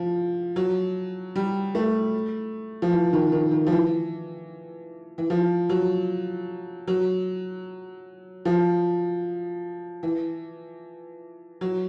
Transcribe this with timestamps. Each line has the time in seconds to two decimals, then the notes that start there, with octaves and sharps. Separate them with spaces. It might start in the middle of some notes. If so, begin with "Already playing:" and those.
Already playing: F3
0.56 F#3
1.36 G3
1.75 A3
2.82 F3
2.92 E3
3.13 D#3
3.32 D#3
3.51 D#3
3.67 F3
3.72 E3
5.18 E3
5.30 F3
5.69 F#3
6.88 F#3
8.45 F3
10.03 E3
11.61 F#3